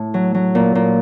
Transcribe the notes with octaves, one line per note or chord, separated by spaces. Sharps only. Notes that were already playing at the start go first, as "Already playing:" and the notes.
Already playing: A2
F#3
F#3
A#2
A#2